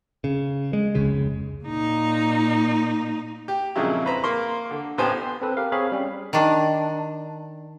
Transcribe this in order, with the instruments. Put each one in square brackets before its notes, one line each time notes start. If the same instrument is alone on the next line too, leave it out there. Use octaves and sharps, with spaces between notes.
[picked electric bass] C#3
G#3
F1 C#2 C#3 G#3
[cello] A#2 D#4
[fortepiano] G4
F2 A#2 C#3 F#3 G#3 E4
B4 C5 A#5 B5
A#3 A#4 C6
D3
A1 A2 B3 G4 C5 G#5
[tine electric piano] C4 A4 B4
G4 A#4 F5
C4 G#4 C#5 F5 B5
G3 C#4
[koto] D#3 D4